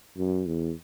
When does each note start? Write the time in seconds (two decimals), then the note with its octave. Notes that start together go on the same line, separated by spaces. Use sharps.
0.17 F#2
0.46 E2